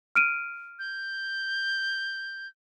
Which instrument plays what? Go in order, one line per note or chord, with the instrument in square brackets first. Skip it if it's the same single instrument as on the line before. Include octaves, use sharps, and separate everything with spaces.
[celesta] F6 D7 D#7
[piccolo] G6